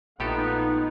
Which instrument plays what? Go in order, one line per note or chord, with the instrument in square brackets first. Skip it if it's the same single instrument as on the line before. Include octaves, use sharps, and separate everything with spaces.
[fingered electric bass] A#1 [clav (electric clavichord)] A2 G4 A4 [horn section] B3 F4 [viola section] D#4 F#5